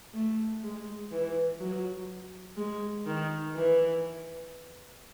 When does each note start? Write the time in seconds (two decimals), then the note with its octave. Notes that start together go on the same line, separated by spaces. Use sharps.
0.14 A3
0.63 G#3
1.11 E3
1.60 F#3
2.57 G#3
3.06 D#3
3.55 E3